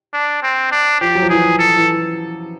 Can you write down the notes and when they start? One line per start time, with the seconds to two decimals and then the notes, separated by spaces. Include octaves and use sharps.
0.14 D4
0.43 C4
0.72 D4
1.01 F3 G4
1.15 F#3
1.23 F3
1.30 E3 G#4
1.59 A4
1.76 E3